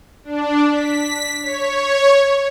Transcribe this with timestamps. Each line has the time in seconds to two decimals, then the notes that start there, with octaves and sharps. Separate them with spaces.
0.24 D4
0.72 B6
1.42 C#5